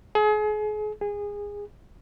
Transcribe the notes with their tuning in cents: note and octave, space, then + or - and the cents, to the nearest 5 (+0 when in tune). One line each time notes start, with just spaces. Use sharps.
G#4 +35
G#4 -20